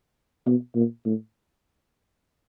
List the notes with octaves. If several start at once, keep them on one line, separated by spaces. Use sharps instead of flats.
B2
A#2
A2